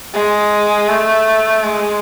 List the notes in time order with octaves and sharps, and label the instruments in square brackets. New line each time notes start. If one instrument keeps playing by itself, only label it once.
[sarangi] G#3
A3
G#3